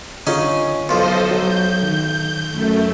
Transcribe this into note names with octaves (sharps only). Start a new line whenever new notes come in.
D3 C#4 D#4 F4 G#4
B1 F3 A4 C5 D#5
F#3 G6
D#3
F#2 A3